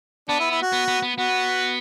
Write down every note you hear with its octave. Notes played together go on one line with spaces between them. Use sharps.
B3 D4
E4
E4
F#4
B3
B3
B3
B3 F#4